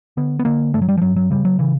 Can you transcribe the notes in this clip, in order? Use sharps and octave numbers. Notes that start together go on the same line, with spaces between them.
D3 B3
B3
D3 A#3
G2 A3
F#3
G3
F3
G2 F#3
F#3
C#3 G3
F#3
C#3 E3